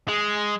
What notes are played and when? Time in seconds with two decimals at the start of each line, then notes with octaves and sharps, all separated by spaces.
0.08 G#3